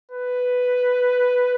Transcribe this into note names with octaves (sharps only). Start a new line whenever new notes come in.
B4